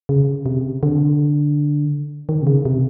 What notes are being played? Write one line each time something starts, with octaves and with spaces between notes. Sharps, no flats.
C#3
C3
D3
D#3
C3
C#3
C3